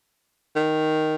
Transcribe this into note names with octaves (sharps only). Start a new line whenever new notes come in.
D#3